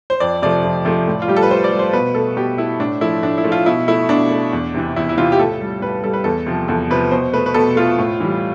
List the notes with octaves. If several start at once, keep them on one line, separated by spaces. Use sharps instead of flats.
C5
F2 D5
C3 F3 A3 D5
F2
C3 F3 A3
A2
F4
G3 G4
A4
B4
A2 C5
D5
G3
C5
B2 B4
A3 A4
B2 G4
A3 E4
A2 D4
F3 A3 E4
A2 D4
E4
F3 A3
F4
B2 E4
A3 E4
B2 D4
A3
E2
C3 E3
E2 E4
E4
C3 E3 F4
G4
A2 A4
G3
A2 B4
G3 A4
B4
E2 A4
C3 F3
E2 A4
C3 F3 B4
B2 C5
A3 B4
B4
B2 A4
A3 F4
A2
E3 G3